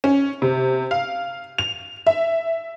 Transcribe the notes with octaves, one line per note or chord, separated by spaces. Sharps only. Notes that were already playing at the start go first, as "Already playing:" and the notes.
C#4
C3
F5
F7
E5